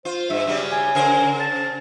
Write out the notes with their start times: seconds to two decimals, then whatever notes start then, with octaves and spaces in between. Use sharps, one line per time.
0.05 F4 C5
0.30 G2 E5
0.45 C#3 F#3 G3
0.72 G#5
0.95 C#3 A#4 C5
1.40 A5